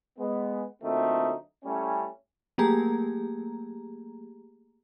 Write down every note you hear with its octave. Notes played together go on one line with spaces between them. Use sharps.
G#3 B3
A#2 D3 F#3 A3 C4 D#4
A2 G3 A3 C#4
F#3 A3 A#3 G4 G#4 A#5